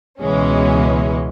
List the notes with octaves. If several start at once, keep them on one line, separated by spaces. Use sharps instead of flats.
C#2 B2 E3 G#3 C#4